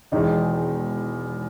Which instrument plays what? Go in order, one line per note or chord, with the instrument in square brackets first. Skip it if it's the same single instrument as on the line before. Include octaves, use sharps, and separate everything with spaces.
[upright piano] E1 E2 D#3 G#3 D#4